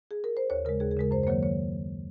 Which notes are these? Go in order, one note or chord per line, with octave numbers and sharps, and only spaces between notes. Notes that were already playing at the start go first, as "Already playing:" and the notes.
G#4
A#4
C5
D#2 C#5
C#3 G#3 A#4
D#2 G#4
G#4
C#3 G#3 A#4
F#2 C5
C5
D#3 F#3 A#3 C#5
C#5